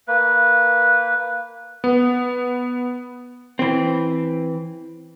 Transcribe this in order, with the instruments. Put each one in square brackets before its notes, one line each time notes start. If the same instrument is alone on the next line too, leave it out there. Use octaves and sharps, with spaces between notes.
[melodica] A#3 B4
[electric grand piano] B3
[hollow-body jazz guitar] E3 C4